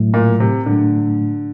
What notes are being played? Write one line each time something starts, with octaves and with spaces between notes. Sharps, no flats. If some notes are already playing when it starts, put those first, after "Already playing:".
Already playing: A2 F#3 A3
A#2
C3
A2 D3 F#3 A3